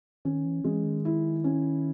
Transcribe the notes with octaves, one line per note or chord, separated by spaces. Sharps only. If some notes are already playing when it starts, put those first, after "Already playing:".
D#3 C#4
E3
E3 G#3
D#3
E4
C#4